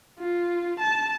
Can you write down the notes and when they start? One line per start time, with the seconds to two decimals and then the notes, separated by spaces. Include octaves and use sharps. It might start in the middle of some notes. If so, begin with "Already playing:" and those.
0.19 F4
0.79 A5